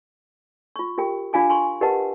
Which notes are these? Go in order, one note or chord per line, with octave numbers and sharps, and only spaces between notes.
F4 C#6
F4 G4 A#4 G5
D4 F4 F5 G#5 D6
G#5 C6 C#6
G4 A#4 B4 D#5 F#5 A5